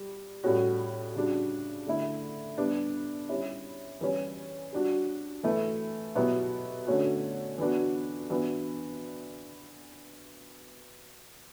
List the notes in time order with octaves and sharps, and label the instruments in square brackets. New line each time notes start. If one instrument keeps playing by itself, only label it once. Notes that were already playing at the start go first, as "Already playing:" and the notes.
Already playing: [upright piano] G3 G4
A2 G3 C#4 F#4
C#3 G3 D4 F#4
D3 A3 E4
G3 B3 D4
G3 C#4 E4
E3 G3 C#4
G3 D4 F#4
E3 A3 E4
B2 F#3 B3 E4 G4
D3 A3 C#4 F#4
E3 B3 D4 F#4
E3 B3 D4 F#4